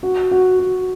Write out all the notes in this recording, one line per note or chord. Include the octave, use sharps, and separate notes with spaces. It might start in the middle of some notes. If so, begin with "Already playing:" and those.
F#4
F#4
F#4